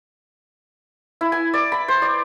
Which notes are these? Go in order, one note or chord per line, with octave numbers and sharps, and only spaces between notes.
E4
G#5
D5
B5
C5
D5